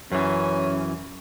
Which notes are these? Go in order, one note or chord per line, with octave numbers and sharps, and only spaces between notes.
F#2 E3 C#4